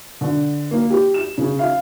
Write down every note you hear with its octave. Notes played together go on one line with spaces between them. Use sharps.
D3
A#3
G4
E7
C#3
F5